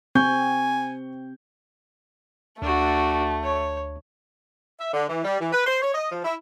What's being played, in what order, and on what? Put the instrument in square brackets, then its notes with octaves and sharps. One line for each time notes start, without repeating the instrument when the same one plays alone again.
[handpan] C4 [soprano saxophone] G#5 [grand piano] C#6 G6
[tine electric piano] D2 [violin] A3 [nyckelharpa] D4 F#4
[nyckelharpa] C#5
[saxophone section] E5
D3
E3
G3
E3
B4
C5
C#5
D#5
F3
E4